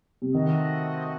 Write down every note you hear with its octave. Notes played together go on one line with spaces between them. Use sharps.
C3
D#3 A3 C4 F#4 A4 D#5